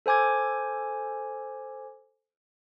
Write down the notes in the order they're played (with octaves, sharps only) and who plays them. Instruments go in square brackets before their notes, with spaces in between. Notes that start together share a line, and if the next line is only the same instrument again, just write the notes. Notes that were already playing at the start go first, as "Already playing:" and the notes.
[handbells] A4 C5 G#5 D6 G#6